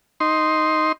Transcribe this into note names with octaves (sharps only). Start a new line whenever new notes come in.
D#4 C6